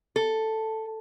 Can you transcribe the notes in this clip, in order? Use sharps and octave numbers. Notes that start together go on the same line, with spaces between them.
A4